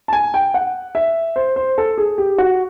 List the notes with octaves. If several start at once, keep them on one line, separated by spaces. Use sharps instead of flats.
A5
G#5
G5
F#5
E5
C5
C5
A4
G#4
G4
F#4